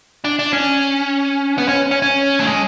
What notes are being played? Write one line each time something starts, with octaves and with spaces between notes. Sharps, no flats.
D4
D4
C#4
B3
C#4
C#4
C#4
A3
G#3